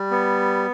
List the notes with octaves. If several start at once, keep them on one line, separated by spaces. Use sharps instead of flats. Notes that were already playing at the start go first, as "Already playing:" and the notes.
Already playing: G3
B3